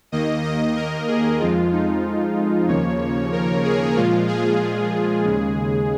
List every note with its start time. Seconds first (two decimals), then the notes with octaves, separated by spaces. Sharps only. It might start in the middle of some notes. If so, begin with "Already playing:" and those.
0.12 D#2 D#3 A#3 D#5
0.44 D#5
0.76 A#4
1.08 G#4
1.40 F2 F3 G#3 F4
1.73 D#4
2.68 D#2 C#3 F3 A#3 C#5
3.32 A#4
3.64 G#4
3.96 A#2 F3 G#3 F4
4.28 G#4
5.24 D#2 C#3 G#3